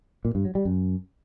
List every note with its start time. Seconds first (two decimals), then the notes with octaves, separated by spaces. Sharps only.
0.25 A#2
0.35 G2
0.45 F#3
0.55 G3
0.65 F#2